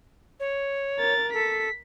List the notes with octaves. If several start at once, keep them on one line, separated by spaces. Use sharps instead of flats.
C#5
A#4 A6
A4 B6